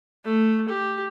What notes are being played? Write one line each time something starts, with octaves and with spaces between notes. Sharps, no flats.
A3
G4